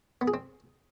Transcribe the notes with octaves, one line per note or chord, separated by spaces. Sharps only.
B3
G#4
C4